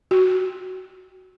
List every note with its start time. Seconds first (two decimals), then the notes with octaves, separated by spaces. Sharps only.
0.11 F#4